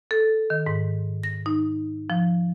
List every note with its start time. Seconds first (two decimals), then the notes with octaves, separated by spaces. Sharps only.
0.11 A4
0.50 D#3
0.67 G#2
1.23 A#6
1.46 D#4
2.10 F3